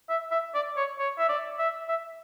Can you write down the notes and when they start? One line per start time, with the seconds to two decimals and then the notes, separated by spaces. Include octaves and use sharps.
0.09 E5
0.32 E5
0.54 D5
0.77 C#5
0.99 C#5
1.19 E5
1.29 D5
1.59 E5
1.89 E5